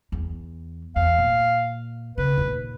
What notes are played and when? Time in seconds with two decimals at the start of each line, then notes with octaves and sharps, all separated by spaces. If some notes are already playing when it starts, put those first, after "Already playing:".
0.12 E2
0.96 E2 F5
1.18 A#2
2.18 C#3 B4
2.38 D#2 A#2